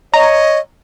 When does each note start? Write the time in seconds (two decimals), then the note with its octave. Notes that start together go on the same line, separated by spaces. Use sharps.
0.14 C#5 D#5 A#5